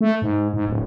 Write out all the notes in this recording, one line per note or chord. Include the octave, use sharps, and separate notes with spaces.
A3
G#2
G#2
D1